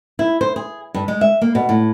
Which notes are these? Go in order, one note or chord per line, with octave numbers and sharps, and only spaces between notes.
E4
C5
G#4
G2
G#3
E5
A#3
B2
A2